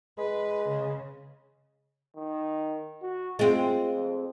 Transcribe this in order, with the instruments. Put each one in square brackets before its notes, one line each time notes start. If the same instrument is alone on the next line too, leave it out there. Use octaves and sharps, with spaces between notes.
[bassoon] G#3 [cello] B4
[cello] C#3
[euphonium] D#3
F#4
[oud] G#3 C4 [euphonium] F4
[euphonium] F2